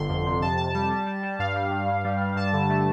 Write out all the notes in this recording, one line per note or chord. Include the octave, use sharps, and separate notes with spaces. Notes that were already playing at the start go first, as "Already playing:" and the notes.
Already playing: G1 D3 C6
F2
C3
F2 A5
F2 A5
G3 A5
G3
G3
G3
G2 F5
G3
G2
G2
G3
G3
G2 A5
D3
A3